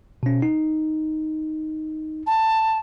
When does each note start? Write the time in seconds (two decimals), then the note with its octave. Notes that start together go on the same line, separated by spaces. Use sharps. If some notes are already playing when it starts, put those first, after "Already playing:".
0.23 B2 C#4
0.42 D#4
2.27 A5